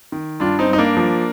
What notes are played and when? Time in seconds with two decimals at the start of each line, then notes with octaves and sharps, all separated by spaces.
0.12 D#3
0.40 G2 D4 F4
0.59 C4 D#4
0.69 G2 D#4
0.78 A#3 D4
0.97 F3